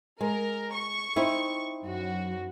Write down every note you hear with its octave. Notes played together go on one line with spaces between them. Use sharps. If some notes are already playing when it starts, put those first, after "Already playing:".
G#3 A#4
C#6
C4 D#4 E4
F#2 F#4